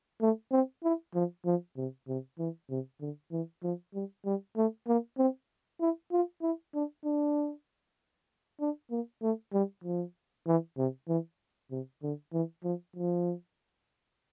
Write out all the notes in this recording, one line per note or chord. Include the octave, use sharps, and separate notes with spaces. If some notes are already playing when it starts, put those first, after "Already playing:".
A3
C4
E4
F3
F3
C3
C3
E3
C3
D3
E3
F3
G3
G3
A3
A#3
C4
E4
F4
E4
D4
D4
D4
A#3
A3
G3
F3
E3
C3
E3
C3
D3
E3
F3
F3